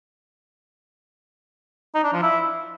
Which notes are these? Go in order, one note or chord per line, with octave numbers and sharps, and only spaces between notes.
D#4
D4
F3
E4